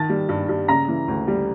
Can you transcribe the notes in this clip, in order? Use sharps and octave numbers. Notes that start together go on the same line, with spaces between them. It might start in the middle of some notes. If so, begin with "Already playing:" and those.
Already playing: D#3 A5 A6
G3
G2
G2
C#3 A#5 A#6
E3
D2
G3